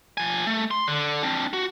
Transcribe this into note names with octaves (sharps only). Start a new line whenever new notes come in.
F3 G#5
A3
C6
D3
C4 D4
F#4